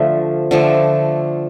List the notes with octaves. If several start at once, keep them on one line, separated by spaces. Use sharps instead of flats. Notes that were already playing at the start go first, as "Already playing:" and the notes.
Already playing: D3 F3 A3 E5
D3 F3 A3